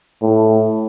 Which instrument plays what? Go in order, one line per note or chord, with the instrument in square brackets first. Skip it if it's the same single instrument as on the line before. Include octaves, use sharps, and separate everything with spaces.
[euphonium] A2